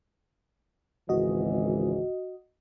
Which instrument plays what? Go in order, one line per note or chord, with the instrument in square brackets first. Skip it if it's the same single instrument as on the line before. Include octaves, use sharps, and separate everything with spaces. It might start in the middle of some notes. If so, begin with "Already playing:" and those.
[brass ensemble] G#1 C#2 E3 [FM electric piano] F#4 D#5